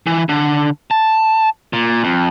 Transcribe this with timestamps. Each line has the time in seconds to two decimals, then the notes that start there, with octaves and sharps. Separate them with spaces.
0.07 E3
0.29 D3
0.91 A5
1.73 A#2
2.04 F2